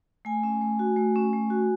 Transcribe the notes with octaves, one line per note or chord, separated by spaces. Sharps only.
A3 G#5
C#4
A3
F#4
A3
C#4
A3
F#4